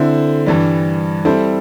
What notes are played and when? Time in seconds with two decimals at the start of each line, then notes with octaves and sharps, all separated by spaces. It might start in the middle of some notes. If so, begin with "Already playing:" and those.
Already playing: D3 C4 E4 C5
0.46 G2 E3 G3
1.25 G3 C4 E4 A4 C5